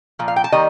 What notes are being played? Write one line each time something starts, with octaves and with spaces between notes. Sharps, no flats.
A#2 F3
F5
G5
A5
D#3 G3 A#3 D#5